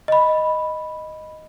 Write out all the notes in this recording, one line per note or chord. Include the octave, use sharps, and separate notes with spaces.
D#5 B5